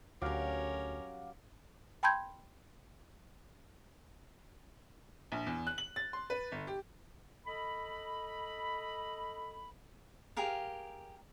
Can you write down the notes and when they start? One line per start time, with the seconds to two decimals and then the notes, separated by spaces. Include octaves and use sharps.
0.22 D2 F#3 C#4 G4 A#4 F5 F#5 D6
2.03 G5 A5 B5 C6 G6 G#6
5.32 A#1
5.47 E2
5.67 F#6
5.78 F#7
5.96 A6
6.13 C6
6.30 B4
6.52 G1
6.67 G4
7.46 A4 D#5 B5
10.36 G4 G#4 A#4 F5